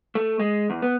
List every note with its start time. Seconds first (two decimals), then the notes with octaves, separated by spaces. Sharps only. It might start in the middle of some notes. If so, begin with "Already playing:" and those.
0.15 A3
0.40 G#3
0.70 E2
0.82 B3